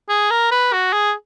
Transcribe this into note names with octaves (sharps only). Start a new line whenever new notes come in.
G#4
A#4
B4
F#4
G#4